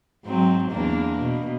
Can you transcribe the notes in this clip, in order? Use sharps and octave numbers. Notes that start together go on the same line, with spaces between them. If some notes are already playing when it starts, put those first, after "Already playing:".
G#2 F#3 C4
E2 A#3 D4
B2